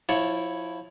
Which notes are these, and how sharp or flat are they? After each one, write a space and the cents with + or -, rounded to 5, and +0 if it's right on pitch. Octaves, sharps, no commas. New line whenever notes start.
F3 +20 E4 +0 C#5 +0